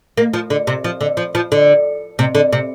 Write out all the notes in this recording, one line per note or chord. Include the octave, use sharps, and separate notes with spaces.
A#3
F3
D3
C3
F3
D3
F3
F3
D3
C3
D3
C3